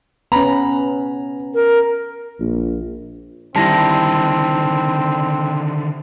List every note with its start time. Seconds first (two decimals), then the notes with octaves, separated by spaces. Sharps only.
0.32 B3 C#4 A#5 B5
1.54 A#4
2.39 A#1
3.56 D3 D#3 G3 C4 E4 A5 A#6